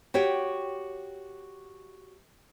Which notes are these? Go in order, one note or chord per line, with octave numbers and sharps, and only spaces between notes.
F#4 G4 C#5 G5